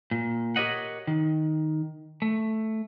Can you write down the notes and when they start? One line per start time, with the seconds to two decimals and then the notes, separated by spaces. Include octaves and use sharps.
0.11 A#2
0.56 G4 A#4 C#5 D#5 F#5
1.07 D#3
2.22 A3